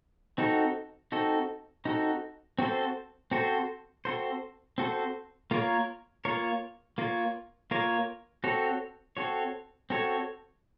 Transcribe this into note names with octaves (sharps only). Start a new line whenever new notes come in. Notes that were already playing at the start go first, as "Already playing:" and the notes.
C4 D#4 F#4 A4
C4 D#4 F#4 A4
C4 D#4 F#4 A4
C4 F#4 A4 C5
C4 F#4 A4 C5
C4 F#4 A4 C5
C4 F#4 A4 C5
A#3 F4 A#4 C#5
A#3 F4 A#4 C#5
A#3 F4 A#4 C#5
A#3 F4 A#4 C#5
C4 F#4 A4 C#5
C4 F#4 A4 C#5
C4 F#4 A4 C#5